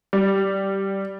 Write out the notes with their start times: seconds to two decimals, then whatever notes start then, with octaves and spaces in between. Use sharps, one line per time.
0.13 G3